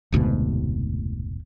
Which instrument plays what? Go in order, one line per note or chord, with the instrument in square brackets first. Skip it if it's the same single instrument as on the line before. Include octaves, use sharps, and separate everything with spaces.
[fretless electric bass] F1 D2 G#2 B2